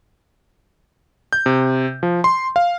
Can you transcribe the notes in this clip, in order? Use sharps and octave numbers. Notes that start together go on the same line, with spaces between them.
G6
C3
F3
C6
F5